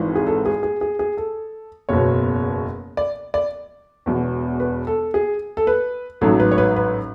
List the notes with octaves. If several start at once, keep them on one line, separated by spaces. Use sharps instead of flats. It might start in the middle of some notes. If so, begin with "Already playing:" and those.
Already playing: G#1 G#2 E3
G#4
A4
G#4
G#4
G#4
G#4
A4
F#1 E2 B2 C#5
D5
D5
E1 E2 B2
B4
A4
G#4
A4
B4
A1 G#2 F#3 A4
B4
C#5
B4
B4